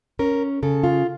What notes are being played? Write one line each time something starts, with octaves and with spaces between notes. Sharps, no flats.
C#4 A#4
C#3 A4
F4